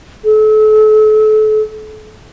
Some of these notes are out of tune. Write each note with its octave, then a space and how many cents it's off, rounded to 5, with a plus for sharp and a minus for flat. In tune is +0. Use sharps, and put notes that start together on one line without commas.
A4 -35